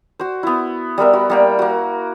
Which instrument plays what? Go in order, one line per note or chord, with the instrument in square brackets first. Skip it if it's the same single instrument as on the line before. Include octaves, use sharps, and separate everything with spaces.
[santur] F#4 C5
B3 E4
G3 B3 A#4 E5
F#4
G3 A#3 G5
A#3 F#4